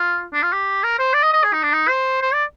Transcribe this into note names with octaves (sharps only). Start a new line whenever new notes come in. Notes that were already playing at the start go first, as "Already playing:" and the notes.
Already playing: F4
D4
F4
G4
A#4
C5
D5
D#5
D#5
G#4
D#4
D4
D#4
C5
C5
D5